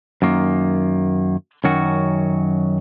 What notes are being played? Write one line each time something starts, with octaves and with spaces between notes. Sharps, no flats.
F#2 D#3 A#3
F#2 D#3 F#3 C#4 F#4